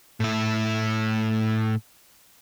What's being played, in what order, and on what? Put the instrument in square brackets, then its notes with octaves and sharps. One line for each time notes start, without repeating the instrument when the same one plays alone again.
[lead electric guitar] A2 E4